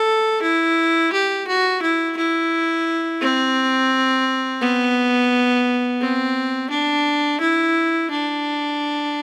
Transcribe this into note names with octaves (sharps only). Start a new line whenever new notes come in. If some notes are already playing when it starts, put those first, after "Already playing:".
Already playing: A4
E4
G4
F#4
E4
E4
C4
B3
C4
D4
E4
D4